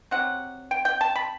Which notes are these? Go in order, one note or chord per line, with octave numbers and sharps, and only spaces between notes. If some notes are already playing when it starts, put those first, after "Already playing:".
C3 F#3 C4 F#5
G5
G5
A5
B5